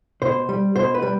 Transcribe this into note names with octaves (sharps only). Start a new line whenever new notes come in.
B2 C5
G3
B2 C5
B4
G3